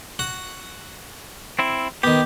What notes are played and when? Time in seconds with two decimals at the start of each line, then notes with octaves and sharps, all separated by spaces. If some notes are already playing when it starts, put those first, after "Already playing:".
0.19 F#4 F#5
1.59 C4 E4
2.03 D#3 B3 G4